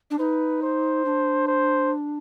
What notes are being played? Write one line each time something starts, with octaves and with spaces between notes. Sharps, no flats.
D4
D#4 B4
C5
D4
C5